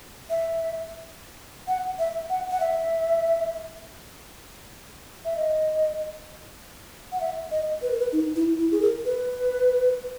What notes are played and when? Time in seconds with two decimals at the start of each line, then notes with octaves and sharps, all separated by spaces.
0.30 E5
1.68 F#5
1.99 E5
2.30 F#5
2.51 F#5
2.60 E5
5.25 E5
5.37 D#5
7.12 F#5
7.21 E5
7.51 D#5
7.82 B4
7.91 A#4
7.99 B4
8.12 D#4
8.36 E4
8.59 E4
8.72 G#4
8.82 A#4
9.05 B4